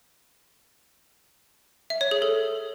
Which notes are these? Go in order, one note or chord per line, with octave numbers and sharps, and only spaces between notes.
E5
C#5
G#4
A4